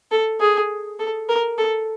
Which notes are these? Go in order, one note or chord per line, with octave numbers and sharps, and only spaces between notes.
A4
G#4
A4
A#4
A4